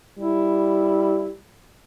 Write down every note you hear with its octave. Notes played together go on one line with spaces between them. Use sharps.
G3 E4